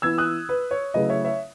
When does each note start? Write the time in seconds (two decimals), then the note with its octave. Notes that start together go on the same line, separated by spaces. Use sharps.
0.02 E3 B3 E4 E6 G#6
0.18 D#6 F#6
0.49 B4
0.71 C#5
0.94 C#3 F#3 A3 E4 B4 D#5
1.09 C#5 E5
1.25 C#5 E5